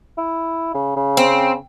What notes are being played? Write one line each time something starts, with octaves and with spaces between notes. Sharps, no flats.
E4
C#3
C#3
C4